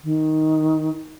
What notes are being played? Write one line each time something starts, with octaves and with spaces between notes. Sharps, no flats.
D#3